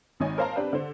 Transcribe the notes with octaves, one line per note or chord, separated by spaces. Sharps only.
G#1 D#3 C#5 D#5 G#5
A#4 C5 F5 A5 A#5
C4 D4 G4 B4
D3 C5